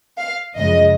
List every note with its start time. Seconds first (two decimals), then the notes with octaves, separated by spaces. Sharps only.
0.19 F5
0.56 F#2 C#3 F3 G#3 D#5